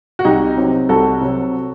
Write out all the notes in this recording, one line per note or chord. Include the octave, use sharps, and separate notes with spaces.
F#4
C2 D#4 G4
C3 F#3
C2 F#4 A4
C3 F#3